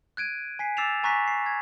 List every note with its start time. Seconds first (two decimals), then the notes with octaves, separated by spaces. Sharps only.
0.17 F#6 G#6 D7 D#7
0.59 G#5 B6 C7
0.77 D6 E6 A6 C7 E7 F7
1.03 G#5 A#5 C#6 F#6 A#6 B6
1.28 C7
1.46 G#6